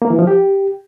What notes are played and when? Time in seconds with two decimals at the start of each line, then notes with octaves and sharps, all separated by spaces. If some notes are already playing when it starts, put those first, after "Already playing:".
0.02 A#3
0.10 E3
0.19 F3
0.27 G4